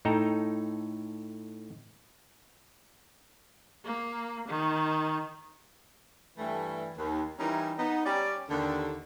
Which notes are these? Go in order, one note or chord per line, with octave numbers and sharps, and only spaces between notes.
A2 D#4 A4 G5 A#5
A#3
D#3
G2 E3 G3 A3
D#2
E3 G3 C#4 D#4 E4 A#4
B3 D#4
G3 C#4 D5
D#2 D3